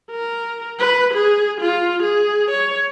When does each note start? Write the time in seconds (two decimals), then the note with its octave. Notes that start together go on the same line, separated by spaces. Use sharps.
0.11 A#4
0.79 B4
1.14 G#4
1.61 F4
2.03 G#4
2.51 C#5